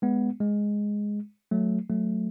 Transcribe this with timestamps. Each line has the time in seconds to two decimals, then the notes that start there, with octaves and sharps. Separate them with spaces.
0.02 G#3 B3
0.40 G#3
1.51 F#3 A3
1.90 F#3 A3